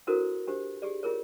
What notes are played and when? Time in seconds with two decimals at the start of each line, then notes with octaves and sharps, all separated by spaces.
0.07 D4 E4 F#4 A4 A#4 C5
0.47 D4 G4 C5
0.82 G4 G#4 D5
1.03 F4 G#4 A#4 C#5